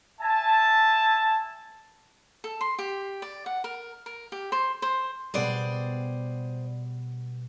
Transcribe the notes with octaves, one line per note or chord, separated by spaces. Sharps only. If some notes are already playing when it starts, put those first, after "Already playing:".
E5 G#5 A5
A4
C6
G4
D5
F#5
A#4
A#4
G4
C5
C5
B2 G3 B3 G#4 C5 D5